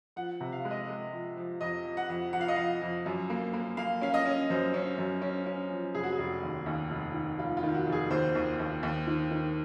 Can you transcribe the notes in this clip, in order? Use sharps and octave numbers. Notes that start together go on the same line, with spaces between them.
F3 F#5
C3
F5
G#3
D#5
G#3
F3
F3
F2 D#5
F3
F#5
F2
F3 F#5
F5
D#5
F3 F5
F2
F#2
A#3
A#3
A#3 F5
C#4 F5
D#5
C#4
F#2 C5
C#4
F#2
C#4
C#4
F3
F1 G#4
F#4
G#4
F1
D#2
D#2
F1
D#3
F1 F4
F4
D#3
F#4
F1
G#4
D#2 C5
D#2
D#2
D#2
D#3
D#3